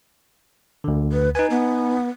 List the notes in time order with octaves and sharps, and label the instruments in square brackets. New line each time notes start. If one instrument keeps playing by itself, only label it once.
[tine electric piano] D2 D3
[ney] B4
[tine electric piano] D#4 G#5 [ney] B4
[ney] B3